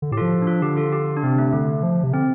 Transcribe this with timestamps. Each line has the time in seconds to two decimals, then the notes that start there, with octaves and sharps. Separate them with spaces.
0.02 D3
0.12 A2 G4
0.17 F4 A4
0.22 F3
0.42 D4
0.47 F4
0.62 D3 G4
0.77 F4 A4
0.92 G4
1.17 D4
1.23 C3 C4
1.38 A3
1.53 D3 A3
1.83 F3
2.04 C3
2.13 D3 C4